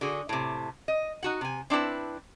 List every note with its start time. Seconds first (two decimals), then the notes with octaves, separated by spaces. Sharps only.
0.01 D3 F#4 G#4
0.29 A2 C3
0.88 D#5
1.23 D#4 F#4 F#5
1.41 C3 G#5
1.70 C4 D4 E4 B4 A5